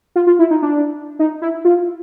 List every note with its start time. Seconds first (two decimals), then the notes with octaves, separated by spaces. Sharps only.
0.16 F4
0.27 F4
0.39 E4
0.51 D#4
0.62 D4
1.19 D#4
1.42 E4
1.65 F4